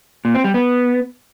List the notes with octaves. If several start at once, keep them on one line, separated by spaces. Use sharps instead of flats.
A#2
C4
G3
B3